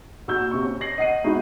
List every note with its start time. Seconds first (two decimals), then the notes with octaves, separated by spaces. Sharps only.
0.28 A#2 F#4 E6 G6
0.51 C3 C#6
0.64 C#4
0.81 A#6 C7 F#7
0.98 D#5 F#5 C7 D#7
1.24 G#3 B3 D#4 E4 F#4